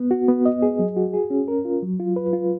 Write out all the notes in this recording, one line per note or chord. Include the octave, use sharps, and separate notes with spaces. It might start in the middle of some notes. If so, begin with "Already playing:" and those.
Already playing: B3
F#4
B3
D#5
G#4
F#3
F#4
G#4
C#4
A#4
F4
F#3
F4
B4
F4